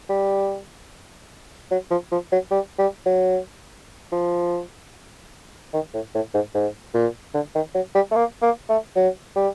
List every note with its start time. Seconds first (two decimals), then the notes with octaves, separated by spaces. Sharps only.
0.09 G3
1.71 F#3
1.91 F3
2.12 F3
2.32 F#3
2.51 G3
2.79 G3
3.06 F#3
4.12 F3
5.74 D#3
5.94 A2
6.15 A2
6.34 G#2
6.54 G#2
6.94 A#2
7.34 D3
7.55 D#3
7.75 F#3
7.95 G3
8.11 A3
8.16 A#3
8.42 A#3
8.69 A3
8.96 F#3
9.36 G3